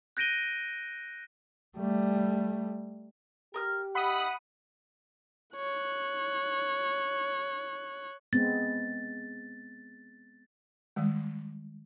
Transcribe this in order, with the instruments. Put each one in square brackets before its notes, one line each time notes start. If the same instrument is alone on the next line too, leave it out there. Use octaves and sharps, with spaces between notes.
[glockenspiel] F#6 G6 A#6 D7 D#7 G7
[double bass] G3 A3
[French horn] G4 [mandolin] A#4 D#6 F6
[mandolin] D#4 E5 [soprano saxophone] F#5 [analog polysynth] B5 D#6
[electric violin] C#5 F#6
[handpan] G#3 B3 C4 [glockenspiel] A6
[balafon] D#3 G3 G#3